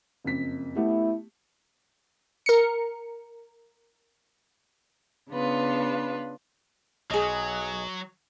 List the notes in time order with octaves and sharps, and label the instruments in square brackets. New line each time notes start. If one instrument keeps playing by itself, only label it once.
[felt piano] F#1 F2 B6
[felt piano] A3 B3 G4 [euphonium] E4
[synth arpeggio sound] A#4 C#7
[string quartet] C#3 B3 D4 F4 B4
[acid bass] B1 [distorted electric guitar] F#3 [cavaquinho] G#4 D#5